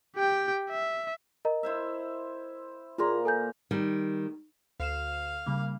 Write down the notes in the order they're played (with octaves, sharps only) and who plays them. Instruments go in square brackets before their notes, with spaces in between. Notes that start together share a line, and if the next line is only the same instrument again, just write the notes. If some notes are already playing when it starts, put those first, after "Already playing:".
[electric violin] G4 G5
E5
[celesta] A#4 D#5 A#5
[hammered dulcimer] E4 C5 E5
[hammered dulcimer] A#2 A#3 A#5 [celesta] F4 G#4 C6
[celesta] A4 G#5 G6
[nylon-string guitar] D#3 G3
[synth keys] D2 C7 E7 [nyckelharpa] F5
[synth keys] C#3 G3 A#3